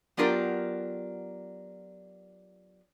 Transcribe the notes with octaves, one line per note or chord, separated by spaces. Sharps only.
F#3 B3 D4 F4 G4 A#4